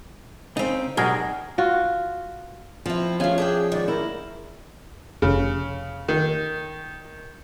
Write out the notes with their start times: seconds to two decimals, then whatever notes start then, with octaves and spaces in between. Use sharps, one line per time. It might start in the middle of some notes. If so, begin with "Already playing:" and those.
0.57 C#3 C4 D#4
0.97 B2 F#3 G3 D#4 G#4 A#4 G#5
1.58 F4 F#4
2.86 F3 C4 E4
3.20 G#3 A3 C#4 F5 G#5
3.38 D4 G#4 C#5 G5
3.72 G#2 D#3 D5
3.88 E4 A#4
5.22 F1 C#3
6.08 D#3